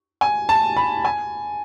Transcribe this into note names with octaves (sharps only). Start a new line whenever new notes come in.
G#5
A5
B5
G#5